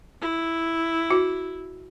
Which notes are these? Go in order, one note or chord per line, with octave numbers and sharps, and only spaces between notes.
E4
F#4